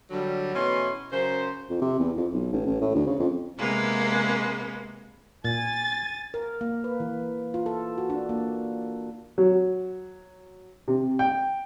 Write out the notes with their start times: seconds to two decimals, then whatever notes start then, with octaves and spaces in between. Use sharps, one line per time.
0.10 D3 F#3 G3
0.54 B2 E3 A3 C#4 E4 C6
1.12 C#3 F#3 A#4 C5
1.70 F2
1.81 C3
1.99 E2
2.17 F2
2.33 B1
2.53 A1
2.66 A1
2.81 A2
2.95 D2
3.07 C#3
3.19 F2
3.58 C3 G#3 A#3 B3
5.44 A#2 G#5 A6
6.34 A#4
6.61 A#3
6.84 B4
7.00 E3
7.54 F4
7.66 A4
7.98 F#4
8.10 D4
8.29 A#3
9.38 F#3
10.88 C3
11.19 G5